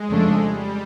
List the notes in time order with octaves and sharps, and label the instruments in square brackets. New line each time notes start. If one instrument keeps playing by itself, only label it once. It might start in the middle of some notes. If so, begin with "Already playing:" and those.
Already playing: [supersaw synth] G#3
[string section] F2 C#3 F3 A3 D4
[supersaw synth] G3